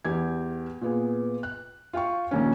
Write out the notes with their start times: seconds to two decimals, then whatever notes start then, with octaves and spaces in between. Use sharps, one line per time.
0.05 E2 G4 G#6
0.81 A#2 B3 G#4
1.43 F#6
1.93 F4 F5 G5 C#6
2.31 A#1 D#2 C#4